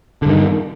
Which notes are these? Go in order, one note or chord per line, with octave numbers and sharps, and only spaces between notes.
G2 D3 D#3